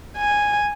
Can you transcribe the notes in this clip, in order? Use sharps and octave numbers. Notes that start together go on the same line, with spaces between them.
G#5